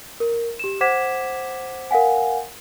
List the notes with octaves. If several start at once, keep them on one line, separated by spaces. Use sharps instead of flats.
A#4
G4 E7
C5 F#5 D6 G#6 B6 E7
A#4 F5 F#5 G#5